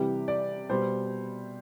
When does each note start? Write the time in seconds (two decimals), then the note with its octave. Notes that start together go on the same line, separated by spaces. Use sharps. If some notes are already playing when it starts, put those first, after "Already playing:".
Already playing: C3 E3 G3 G4
0.28 D5
0.69 B2 G3 C5